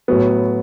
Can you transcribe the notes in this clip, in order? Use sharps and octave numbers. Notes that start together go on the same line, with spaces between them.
A2 F#3 B3